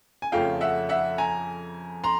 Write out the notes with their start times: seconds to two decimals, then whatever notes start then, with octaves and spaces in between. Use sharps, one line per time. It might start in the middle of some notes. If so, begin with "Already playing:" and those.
0.22 G#5
0.32 F2 C#3 F3 A3 C#4 F5 G5
0.61 E5 F#5
0.89 E5 F#5
1.18 G#5 A#5
2.04 A#5 C6